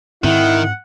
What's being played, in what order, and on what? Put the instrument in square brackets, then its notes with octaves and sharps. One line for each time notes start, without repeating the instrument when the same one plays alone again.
[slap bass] G#2 C4 [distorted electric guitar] D#3 [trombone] E4 [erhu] F#5